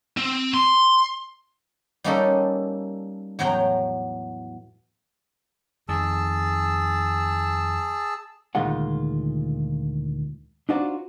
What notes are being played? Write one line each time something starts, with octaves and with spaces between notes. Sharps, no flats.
C4
C6
G3 A#3 C#4 D#4 G4 A4
E2 A2 F#3 G5 A#5
F2 D#3 G#4 A5 E6
D2 A#2 D#3 G#3 F4 F#5
D4 D#4 F4 F#4 C5 D5